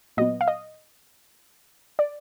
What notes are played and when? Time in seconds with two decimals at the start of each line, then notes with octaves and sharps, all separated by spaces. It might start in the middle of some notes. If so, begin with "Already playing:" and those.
0.17 A#2 F#3 B3 D#5
0.41 F5
0.48 D#5
1.99 D5